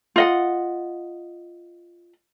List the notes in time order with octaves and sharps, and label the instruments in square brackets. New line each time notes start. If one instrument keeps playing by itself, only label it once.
[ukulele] F4 D#5 F#5